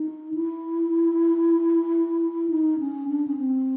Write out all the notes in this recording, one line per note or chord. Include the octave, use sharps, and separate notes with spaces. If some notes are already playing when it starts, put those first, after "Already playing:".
Already playing: D#4
E4
D#4
C#4
D4
C#4
C4